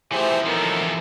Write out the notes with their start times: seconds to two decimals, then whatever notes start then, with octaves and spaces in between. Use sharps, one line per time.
0.12 E3 F3 A3 G4 G#4 C5 E5
0.46 C3 F#3 B3 D#4 A4 A#4 A#5